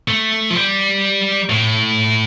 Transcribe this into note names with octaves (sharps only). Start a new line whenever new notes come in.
A3
F3
G3
A2